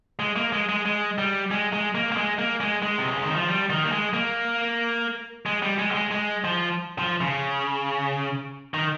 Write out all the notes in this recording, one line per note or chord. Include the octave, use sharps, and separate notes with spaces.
G#3
A#3
G#3
G#3
G#3
G3
G#3
G#3
A#3
A#3
G#3
A#3
G#3
G#3
C3
C#3
D#3
F3
G3
D#3
A#3
G#3
A#3
G#3
G3
G#3
G3
G#3
G#3
F3
F3
C#3
D#3